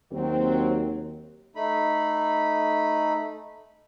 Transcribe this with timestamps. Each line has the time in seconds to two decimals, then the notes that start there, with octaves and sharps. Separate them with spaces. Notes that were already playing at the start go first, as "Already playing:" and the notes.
0.11 D#2 F#3 C4
1.56 A3 D#4 B5